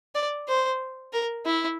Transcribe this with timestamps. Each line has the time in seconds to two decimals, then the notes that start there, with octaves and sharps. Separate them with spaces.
0.15 D5
0.48 C5
1.13 A#4
1.46 E4